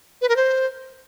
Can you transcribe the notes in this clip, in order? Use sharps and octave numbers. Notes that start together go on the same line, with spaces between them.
B4
A#4
C5